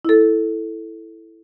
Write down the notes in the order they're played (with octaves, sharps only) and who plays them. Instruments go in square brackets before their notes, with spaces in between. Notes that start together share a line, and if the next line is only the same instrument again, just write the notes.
[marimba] E4 A4